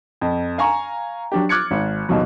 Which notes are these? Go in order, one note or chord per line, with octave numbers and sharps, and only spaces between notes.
F2
F5 G#5 A#5 C#6
F#3 D4 G4
D6 F6 F#6 G#6 A6 C#7
G#1
D#1 D#2 B2 F#3